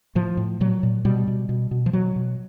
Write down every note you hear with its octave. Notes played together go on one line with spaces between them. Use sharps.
A2 F3
A2
A#2 F#3
A#2
B2 G3
B2
B2
B2
F3
B2 F#3
B2